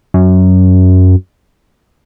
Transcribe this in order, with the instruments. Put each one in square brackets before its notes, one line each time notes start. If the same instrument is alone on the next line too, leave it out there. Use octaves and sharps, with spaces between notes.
[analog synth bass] F#2